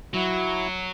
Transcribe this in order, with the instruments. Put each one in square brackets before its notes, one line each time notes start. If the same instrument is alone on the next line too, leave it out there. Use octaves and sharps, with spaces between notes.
[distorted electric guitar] F#3 [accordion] E4 F#4